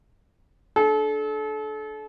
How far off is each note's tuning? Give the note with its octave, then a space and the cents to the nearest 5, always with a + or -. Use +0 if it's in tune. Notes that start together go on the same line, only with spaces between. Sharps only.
D4 +5 A4 -35